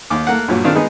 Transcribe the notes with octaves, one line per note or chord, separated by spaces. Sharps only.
D#2 D6
A3 A#3 F#5
G2 A#2 F#3
D#3 C4 D4 F4
G#3 B3 D#4